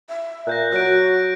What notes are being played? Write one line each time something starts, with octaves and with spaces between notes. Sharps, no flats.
E5
A#2 F#6 G6 A#6
F#3 F#4 F#6 D7